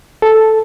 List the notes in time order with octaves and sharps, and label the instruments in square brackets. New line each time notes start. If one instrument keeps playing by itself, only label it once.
[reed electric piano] A4